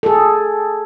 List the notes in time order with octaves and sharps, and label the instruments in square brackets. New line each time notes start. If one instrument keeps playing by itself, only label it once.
[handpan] G#4 A4